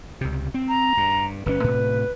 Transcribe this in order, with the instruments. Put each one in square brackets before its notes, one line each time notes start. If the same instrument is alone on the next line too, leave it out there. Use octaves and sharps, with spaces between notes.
[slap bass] C#2 C3
C4
[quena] A#5
[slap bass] G2
[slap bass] G1 C#3 C#4 [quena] B4
[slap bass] A2 C3